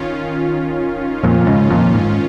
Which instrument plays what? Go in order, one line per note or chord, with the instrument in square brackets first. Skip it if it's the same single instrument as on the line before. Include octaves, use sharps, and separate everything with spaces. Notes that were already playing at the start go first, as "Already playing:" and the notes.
Already playing: [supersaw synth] D#3 C#4 F4
[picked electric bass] F2 A#2
A#2
G#2 C#3
F2 A#2
G#2